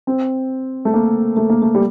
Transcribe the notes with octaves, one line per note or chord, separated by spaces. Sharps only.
C4
A3
A#3
A3
A#3
A3
G3